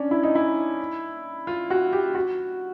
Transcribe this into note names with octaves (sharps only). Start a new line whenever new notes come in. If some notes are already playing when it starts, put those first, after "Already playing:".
Already playing: C#4 D4
E4
D#4
E4
F4
F#4
G4
F#4